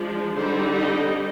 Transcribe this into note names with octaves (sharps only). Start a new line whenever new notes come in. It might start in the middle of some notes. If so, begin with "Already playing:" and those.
Already playing: F3 G#3 D4
D3 G3 C4 D#4 C5
D#5